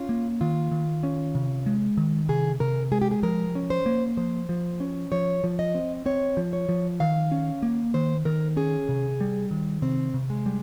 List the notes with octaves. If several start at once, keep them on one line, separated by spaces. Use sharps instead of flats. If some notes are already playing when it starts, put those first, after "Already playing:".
Already playing: C#4 F4
A#3
D#3 F4
D#3
C#4
C3
G#3
D#3
C3 G#4
C3 A#4
G#3 G#4
G4
G#4
F3 A#4
C#4
C5
A#3
F3 C5
F3
C#4
F3 C#5
F3
D#5
C4
C4 C#5
F3
C#5
F3
D#3 F5
C#4
A#3
D#3 C5
D#3 A#4
C#4 G#4
C3
G3
D#3
C3 C4
C3
G#3
G3